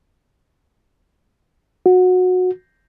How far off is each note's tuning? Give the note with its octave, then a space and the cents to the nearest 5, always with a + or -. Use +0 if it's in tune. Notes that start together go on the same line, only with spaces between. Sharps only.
F#4 -20